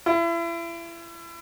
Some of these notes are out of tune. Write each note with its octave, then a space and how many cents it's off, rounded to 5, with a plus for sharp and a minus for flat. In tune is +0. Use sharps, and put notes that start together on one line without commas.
E4 +35